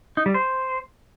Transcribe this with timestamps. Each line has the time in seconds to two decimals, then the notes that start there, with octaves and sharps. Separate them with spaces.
0.17 D#4
0.26 G3
0.34 C5